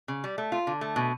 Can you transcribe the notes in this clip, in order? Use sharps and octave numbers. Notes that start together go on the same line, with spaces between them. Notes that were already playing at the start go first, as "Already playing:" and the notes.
C#3
G3
A3
F4
D3
A3
B2